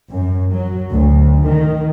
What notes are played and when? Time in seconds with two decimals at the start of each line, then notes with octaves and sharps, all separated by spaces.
0.12 F#2
0.53 F#3
0.92 D2
1.46 D#3